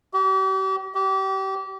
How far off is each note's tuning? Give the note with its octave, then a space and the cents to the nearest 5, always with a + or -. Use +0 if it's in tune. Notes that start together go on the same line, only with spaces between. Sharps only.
G4 -40
G4 -30